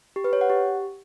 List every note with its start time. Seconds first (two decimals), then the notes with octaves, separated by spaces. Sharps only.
0.16 G4
0.24 B4
0.33 C#5
0.41 F#5
0.50 G4